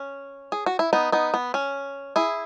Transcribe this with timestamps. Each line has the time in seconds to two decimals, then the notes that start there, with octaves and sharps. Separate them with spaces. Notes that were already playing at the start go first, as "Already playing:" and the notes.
Already playing: C#4
0.52 G#4
0.66 F#4
0.79 E4
0.93 B3 D#4
1.12 B3 D#4
1.34 B3
1.54 C#4
2.16 E4 G#4